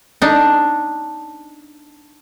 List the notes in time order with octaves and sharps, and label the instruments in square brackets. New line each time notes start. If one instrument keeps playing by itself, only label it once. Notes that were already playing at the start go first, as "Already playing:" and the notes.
[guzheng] D4 D#4